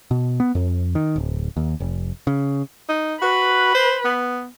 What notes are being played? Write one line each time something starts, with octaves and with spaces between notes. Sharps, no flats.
B2
B3
F2
D#3
D1
D#2
F1
C#3
D#4
F#4 B4
C5
B3